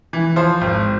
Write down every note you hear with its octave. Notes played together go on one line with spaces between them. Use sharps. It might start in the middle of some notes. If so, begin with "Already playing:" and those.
E3
F3 C5
G#1